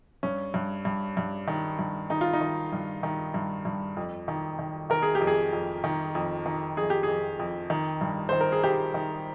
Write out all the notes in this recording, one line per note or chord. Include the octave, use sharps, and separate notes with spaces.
G2 C#4
G2
G2
G2
D#3
G2
D#3 D#4
F4
D#4
D#3
G2
D#3
G2
G2
F2
D#3
D#3
D#3 A#4
G#4
G4
F2
G#4
F2
D#3
F2
D#3
F2 G#4
G4
F2 G#4
F2
D#3
G2
D#3 C5
A#4
G#4
D#3 G4
D#3